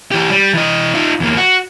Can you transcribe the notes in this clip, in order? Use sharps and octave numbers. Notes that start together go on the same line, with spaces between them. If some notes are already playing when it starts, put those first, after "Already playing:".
E3 G4
G3
E3 D#5
D#4 F4
E2 A#3
F#4